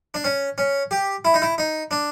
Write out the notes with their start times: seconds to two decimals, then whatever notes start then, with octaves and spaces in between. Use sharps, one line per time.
0.14 D4
0.24 C#4
0.58 C#4
0.91 G4
1.25 E4
1.34 D#4
1.42 E4
1.58 D#4
1.91 D4